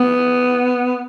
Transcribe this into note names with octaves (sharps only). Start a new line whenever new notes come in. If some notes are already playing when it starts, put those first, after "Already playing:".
Already playing: B3